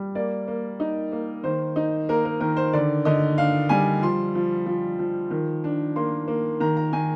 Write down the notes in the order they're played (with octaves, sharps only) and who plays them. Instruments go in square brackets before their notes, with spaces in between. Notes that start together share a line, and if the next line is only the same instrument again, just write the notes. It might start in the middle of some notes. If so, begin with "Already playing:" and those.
Already playing: [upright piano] G3
A#3 D5
A#3
D#4
A#3
D#3 C5
D#4
A#3 A#4
A#4
D#3 A#4
C5
D3 D5
D3 D#5
D4 F5
G3 G#5
F3 C6
F3
F3
F3
D#3
D4
A#3 C6
A#3
D#3 A#5
A#5
D#3 G#5